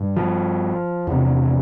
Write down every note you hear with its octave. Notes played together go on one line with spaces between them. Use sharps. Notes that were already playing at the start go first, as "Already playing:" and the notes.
Already playing: G2
F3
E2 C3